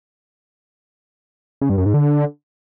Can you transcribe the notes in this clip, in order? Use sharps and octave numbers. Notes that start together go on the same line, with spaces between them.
C#3
G2
F#2
G#2
D3